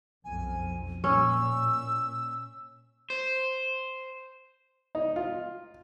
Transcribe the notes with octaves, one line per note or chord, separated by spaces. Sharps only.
B1 F2 G#5
A#2 C#4 E6
C5
D#4
F4